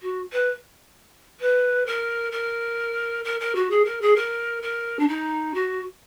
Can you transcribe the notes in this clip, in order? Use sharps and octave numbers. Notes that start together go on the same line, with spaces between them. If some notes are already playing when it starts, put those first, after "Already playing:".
F#4
B4
B4
A#4
A#4
A#4
A#4
F#4
G#4
A#4
G#4
A#4
A#4
D4
D#4
F#4